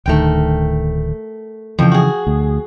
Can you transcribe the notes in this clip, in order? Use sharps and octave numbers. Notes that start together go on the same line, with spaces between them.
D1 D2 D#3 A3 A#4 G5
F2 C#3 E3 F3 G5
F#4 G#4
D2